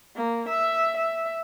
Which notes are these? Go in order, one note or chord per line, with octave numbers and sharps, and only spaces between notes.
A#3
E5
E5